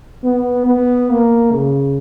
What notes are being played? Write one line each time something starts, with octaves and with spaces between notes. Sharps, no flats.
B3
B3
A#3
C#3